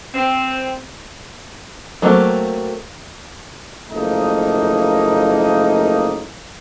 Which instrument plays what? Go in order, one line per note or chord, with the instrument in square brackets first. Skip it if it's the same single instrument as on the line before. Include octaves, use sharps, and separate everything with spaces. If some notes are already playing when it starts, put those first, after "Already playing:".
[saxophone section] C4
[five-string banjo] F#3 A3 A#3 C4
[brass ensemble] F#1 F3 A3 A#3 D#4